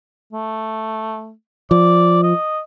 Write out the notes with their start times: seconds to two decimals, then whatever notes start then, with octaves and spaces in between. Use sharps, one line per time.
0.33 A3
1.71 F3 D5
2.24 D#5